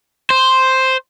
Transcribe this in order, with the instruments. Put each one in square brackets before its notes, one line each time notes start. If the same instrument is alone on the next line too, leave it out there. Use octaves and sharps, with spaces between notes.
[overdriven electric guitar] C5